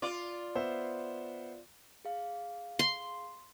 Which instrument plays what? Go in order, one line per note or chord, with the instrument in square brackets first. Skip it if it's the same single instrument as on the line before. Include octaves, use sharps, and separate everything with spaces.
[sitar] F4 D5
[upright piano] B3 C5 E5
[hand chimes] G#4 F5
[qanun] C6